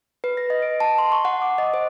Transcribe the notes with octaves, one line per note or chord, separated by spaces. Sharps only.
B4
A#6
D#5
D7
A5
C6
C#6
F#5
D6
D#5
C5